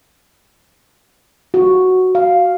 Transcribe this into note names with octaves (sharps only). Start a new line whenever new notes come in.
F#4
F5